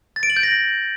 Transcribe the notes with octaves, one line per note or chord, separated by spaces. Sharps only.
A6
D7
F#7
G6
A#6